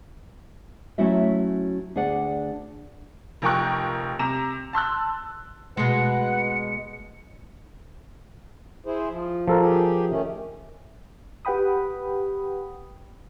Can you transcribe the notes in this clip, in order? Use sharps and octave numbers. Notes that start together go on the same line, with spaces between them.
F#3 A3 C#4 E4 F#4 E5
D2 D4 G#4 D5 F#5
F1 F3 A#4 G5 C#6 F#6
C3 A#5 E7
A5 C6 E6 F#6
B2 G#3 B4 F#5 C#7
E4 G#4 C5
F3
F3 A4 A#4
G4 G#4
D#3 A3 C#4
G4 B4 F#5 G5 B5 D#6